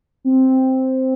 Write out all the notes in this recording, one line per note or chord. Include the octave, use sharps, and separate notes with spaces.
C4